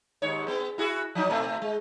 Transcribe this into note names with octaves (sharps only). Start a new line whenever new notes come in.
D#2 G#2 C#5
B3
E4 F#4 G#4
F3 F#3 D#4
A#2 A3 C4
G#3